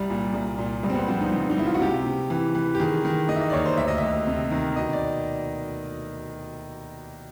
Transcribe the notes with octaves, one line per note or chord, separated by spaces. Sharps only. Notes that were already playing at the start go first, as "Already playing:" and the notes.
Already playing: C2 G3
A#2
C2
A#2
C#2 G3
C4
B3
F3 C4
D#4
C#2
D#4
C#2 E4
F4
F#4
C3 G4
C3
E3
E3
G4
D#3 G#4
D#3
D#3 D#5
E5
D#5
D5
D#2 C#5
C5
D2 E5
D#5
D2 E5
C3
D#3
B2 D#5
D5